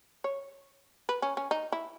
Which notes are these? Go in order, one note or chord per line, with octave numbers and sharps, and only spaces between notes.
C#5
B4
C#4
C#4
D#4
E4